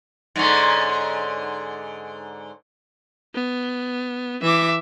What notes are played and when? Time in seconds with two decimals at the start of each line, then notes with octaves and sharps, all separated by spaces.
0.36 G#2 D3 C#4
3.35 B3
4.42 E3 E5 D6